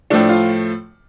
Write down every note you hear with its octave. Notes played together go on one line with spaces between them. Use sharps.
A2 F3 A3 D4
F4